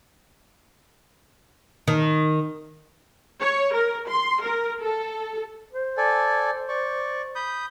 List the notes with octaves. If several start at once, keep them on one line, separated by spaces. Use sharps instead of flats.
D#3
C#5
A#4
C6
A#4
A4
C5
A4 D5 G#5
D5 C#6
B5 D#6 G6